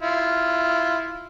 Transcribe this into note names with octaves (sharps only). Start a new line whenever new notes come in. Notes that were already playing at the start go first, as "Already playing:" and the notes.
E4 F4